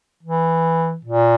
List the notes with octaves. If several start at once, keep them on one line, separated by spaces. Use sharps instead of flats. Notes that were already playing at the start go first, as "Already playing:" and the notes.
E3
A#2